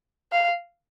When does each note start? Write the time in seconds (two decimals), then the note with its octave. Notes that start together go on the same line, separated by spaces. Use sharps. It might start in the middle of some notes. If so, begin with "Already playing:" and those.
0.32 F5